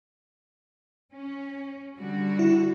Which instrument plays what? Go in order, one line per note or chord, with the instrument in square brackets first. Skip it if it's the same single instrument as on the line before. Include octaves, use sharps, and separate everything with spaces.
[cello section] C#4
D3 G3 F#4
[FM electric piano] E4